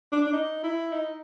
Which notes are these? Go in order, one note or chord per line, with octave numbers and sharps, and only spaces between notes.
D4
D4
D#4
E4
D#4